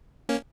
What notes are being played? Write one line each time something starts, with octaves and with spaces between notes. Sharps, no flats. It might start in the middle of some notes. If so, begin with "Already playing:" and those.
A#3 C#4